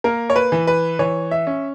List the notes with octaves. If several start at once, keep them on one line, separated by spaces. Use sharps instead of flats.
A#3 A#4
C#5
B4
E3
B4
E3 C#5
E5
C#4